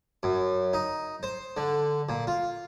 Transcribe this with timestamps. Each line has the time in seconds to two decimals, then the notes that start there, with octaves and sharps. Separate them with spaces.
0.23 F#2
0.73 D#4
1.23 C5
1.57 D3
2.09 A#2
2.27 F4